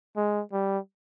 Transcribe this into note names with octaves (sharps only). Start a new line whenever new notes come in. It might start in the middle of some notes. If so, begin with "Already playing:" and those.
G#3
G3